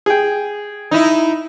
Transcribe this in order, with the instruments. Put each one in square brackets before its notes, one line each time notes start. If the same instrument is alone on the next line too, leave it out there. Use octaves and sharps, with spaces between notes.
[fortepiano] G#4 G5
[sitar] D#4 E4